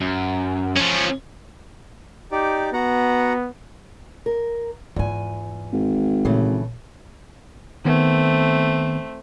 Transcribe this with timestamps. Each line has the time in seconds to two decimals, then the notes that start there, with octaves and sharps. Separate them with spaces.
0.01 F#2
0.76 F3 C#4
2.32 D#4 G4 D5
2.73 B3 F#4 F#5 A#5
4.26 A#4
4.96 E2 G#2 F4 G#5
5.73 G#1
6.25 A#2 C#3 E3 A3
7.85 D#3 A3 B3 C4